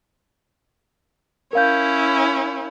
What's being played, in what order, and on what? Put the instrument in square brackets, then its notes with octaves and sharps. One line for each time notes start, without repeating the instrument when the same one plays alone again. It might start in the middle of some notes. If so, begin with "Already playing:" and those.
[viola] C#4 E4 [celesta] A#4 F5 G6